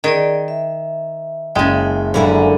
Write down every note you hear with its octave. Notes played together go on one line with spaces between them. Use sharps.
D#3 G#4 D5
E5
F#1 C#3 G#3 G5
F#2 D3 E4 F5 G#5 B5